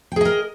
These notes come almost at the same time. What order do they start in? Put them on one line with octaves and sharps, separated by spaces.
G5 G#4 D#5 A#4